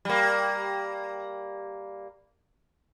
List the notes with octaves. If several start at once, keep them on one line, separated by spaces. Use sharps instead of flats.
G3 A#3